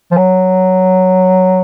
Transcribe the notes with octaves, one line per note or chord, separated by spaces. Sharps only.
F3
F#3